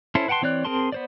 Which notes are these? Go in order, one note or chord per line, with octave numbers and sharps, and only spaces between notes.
C#4 E4 A4 C5
B4 F#5 G5 A5 C6
E3 C4 C#5 D5 F#6
C4 G#4 A#4 A5 C6
B3 C5 D5